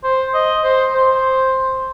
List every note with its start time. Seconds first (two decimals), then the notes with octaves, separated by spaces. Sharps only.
0.04 C5
0.34 D#5
0.64 C5
0.94 C5